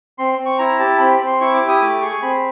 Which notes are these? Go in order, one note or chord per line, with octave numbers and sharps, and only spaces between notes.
C4 C6
C4
C#6
E4 A#5
G4 A5
C4 B5
C4
C6
E4 C#6
D6
G4
D#6
A3 D6
G#4 C#6
C4 B5